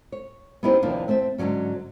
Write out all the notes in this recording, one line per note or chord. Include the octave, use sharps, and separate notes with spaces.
C#5
B3 C#4 D#4 E4 G4 C5
D#2 C3 E3 F3 A#3 D4
A3 C4 C5 E5
G#2 D3 D#3 F#3 C#4